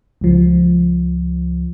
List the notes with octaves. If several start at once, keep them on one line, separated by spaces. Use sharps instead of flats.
C#2 F3